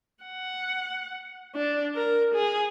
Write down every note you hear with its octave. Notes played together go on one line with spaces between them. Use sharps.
F#5
D4
A#4
G#4